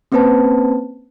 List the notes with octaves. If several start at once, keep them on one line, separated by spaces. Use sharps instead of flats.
A#3 C4 C#4 B4 C5 A5